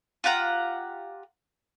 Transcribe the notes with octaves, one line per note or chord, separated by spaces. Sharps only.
F4 G4 F#5 A#5